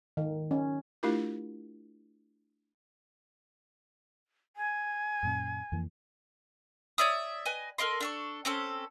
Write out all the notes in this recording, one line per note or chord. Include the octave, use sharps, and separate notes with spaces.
D#3
C#4
A3 D4 E4 F4 G4 A#4
G#5
F#2 A#2 C#4
F2 E3 A#3
C#5 D5 E5 D#6
B4 D#5 G#5
A4 A#4 D#5 C6
D4 A4 C#6
C4 C#4 A4